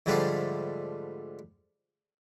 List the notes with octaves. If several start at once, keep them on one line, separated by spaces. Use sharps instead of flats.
G#2 D3 F3 G3 A3 F4